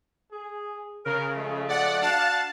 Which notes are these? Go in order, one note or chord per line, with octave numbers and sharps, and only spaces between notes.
G#4
C#3 A#4
F3 G#3 A3
D5 F#5
D4 F#4 F5 F#5 A5